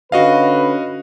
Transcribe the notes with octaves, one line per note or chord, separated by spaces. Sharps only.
D3 C#4 F#4 B4 D#5 F5